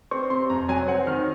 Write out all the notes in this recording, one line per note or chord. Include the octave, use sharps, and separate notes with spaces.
C4 C#6
C3 C6
F2 A#5
F#3 G#5
C4 F#5
D#3 F6